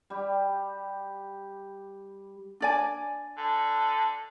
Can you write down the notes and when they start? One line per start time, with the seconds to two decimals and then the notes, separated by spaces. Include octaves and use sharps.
0.10 G3 G4
2.60 D4 D5 G#5
3.38 D3